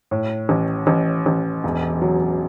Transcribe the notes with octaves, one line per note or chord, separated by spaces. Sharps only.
A2
A1
A1
A1
E1
F#3